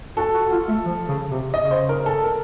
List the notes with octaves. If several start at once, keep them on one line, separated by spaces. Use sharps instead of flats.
F#4 A4
F#4
F4
A3
F3
C#3
C3
C#3 D#5
C5
A#4
A4
A#4